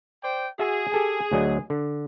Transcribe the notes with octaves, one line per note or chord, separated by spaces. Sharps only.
C5 D5 G5
F#4 G#4 E5
G4 A4 G#5
D2 F#3 D#5
D3